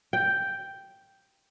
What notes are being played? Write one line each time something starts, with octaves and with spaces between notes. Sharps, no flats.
G5